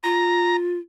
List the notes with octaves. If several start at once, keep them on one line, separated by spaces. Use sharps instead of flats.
F4 A#5